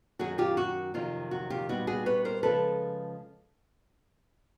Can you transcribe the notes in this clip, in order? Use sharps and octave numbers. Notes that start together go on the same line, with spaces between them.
F#2 D#3 F#3 F#4 G#4
F4 G4
F#4
F2 C3 D#3 F#3 F4
F#4
F4 G4
A#2 G3 B3 D#4 F#4
F#4 G#4
B4 C#5
A#4 C5
C#3 F3 G#3 A4 B4